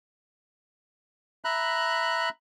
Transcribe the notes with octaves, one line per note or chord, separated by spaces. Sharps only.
E5 A#5 B5 F#6